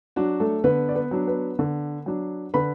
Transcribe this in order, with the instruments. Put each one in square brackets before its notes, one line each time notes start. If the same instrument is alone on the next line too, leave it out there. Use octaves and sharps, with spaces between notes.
[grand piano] F#3 D4 F#4
A3 A4
D3 B3 B4
D5
B3 B4
F#3 D4
B3 B4
D3
F#3 D4
D3 B4 B5